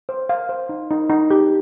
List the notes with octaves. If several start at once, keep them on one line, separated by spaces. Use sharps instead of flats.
C5
F5
C5
D#4
D#4
D#4
G4